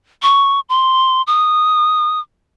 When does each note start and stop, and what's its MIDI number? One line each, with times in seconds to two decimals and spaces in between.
0.22 0.60 85
0.69 1.22 84
1.27 2.20 87